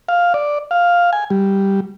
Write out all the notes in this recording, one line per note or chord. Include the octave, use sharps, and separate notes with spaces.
F5
D5
F5
G#5
G3